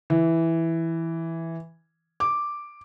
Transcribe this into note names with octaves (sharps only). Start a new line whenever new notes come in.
E3
D6